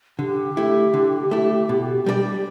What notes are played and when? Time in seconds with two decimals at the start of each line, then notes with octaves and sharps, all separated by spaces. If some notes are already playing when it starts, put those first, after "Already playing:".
0.19 D3 G4
0.57 A3 E4
0.94 D3
1.31 A3 E4
1.69 B2
2.06 G3 D4 A4 D5